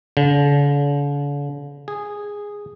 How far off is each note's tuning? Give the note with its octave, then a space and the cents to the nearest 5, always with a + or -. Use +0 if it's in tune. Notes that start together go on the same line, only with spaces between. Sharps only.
D3 -45
G#4 -10